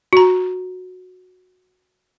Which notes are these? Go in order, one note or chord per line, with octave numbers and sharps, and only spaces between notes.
F#4 A#5